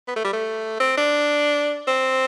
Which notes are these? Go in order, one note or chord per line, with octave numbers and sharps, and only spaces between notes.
B3
A3
G3
A3
C4
D4
C4